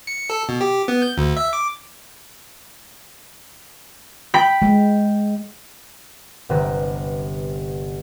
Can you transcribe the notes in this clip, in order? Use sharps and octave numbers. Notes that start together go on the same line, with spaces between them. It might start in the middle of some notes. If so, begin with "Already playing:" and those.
C#7
A4
B2
G4
B3
G6
D2
E5
D6
G5 B5 B6
G#3
G1 C3 B4